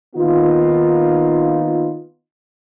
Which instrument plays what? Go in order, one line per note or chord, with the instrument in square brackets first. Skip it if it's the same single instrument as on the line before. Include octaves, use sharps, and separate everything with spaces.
[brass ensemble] D#3 A#3 B3 D#4 F4